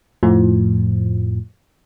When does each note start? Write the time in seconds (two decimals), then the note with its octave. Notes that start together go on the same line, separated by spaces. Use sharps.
0.23 F2 A2 F3